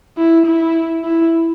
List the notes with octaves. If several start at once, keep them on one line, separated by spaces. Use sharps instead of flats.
E4
E4
E4